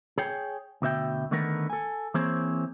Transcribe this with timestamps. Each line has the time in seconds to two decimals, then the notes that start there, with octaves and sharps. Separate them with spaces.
0.18 G#4 C#5 G5
0.82 D2 B2 E5 G5
1.31 D3 D#3 A3 B3 A#4
1.70 A4 G#5
2.14 E3 A#3 C4 G#4 C5 C#5